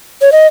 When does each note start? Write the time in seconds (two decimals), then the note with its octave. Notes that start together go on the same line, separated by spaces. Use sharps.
0.22 C#5
0.32 D#5